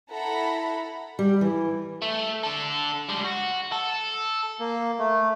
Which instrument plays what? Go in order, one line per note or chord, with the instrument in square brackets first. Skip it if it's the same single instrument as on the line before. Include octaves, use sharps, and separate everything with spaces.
[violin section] E4 A4 F#5 A#5 B5
[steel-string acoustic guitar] G3
E3
[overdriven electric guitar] A3
D3 A4
G3 G#3
F#4
A4
[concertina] A#3
A3